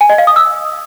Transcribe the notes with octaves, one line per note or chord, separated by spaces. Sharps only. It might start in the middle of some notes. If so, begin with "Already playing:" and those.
G#5
D#5
F5
D#6
E6